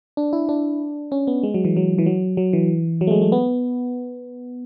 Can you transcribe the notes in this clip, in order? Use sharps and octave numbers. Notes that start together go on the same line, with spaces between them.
D4
E4
D4
C#4
B3
G#3
F#3
E3
F#3
E3
F#3
F#3
E3
F#3
A3
G#3
A3
B3